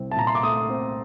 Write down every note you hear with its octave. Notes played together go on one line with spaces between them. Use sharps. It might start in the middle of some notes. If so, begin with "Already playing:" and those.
Already playing: C2 C4
A5
A#2 A#5
C6
D6
A3 D#6
C4